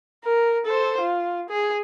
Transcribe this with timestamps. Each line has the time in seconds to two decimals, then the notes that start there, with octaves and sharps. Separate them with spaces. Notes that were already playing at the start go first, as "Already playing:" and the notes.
0.24 A#4
0.66 A4 C5
1.01 F4
1.50 G#4